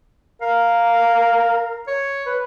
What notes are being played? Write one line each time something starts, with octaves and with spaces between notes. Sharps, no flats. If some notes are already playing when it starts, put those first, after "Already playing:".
A#4 F5
C#5
B4